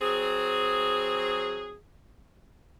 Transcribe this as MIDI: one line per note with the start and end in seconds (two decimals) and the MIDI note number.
0.01 1.75 54
0.01 1.75 60
0.01 1.75 68